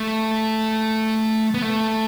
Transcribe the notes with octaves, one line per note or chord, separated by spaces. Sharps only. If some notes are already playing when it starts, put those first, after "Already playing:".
Already playing: A3
B3
A3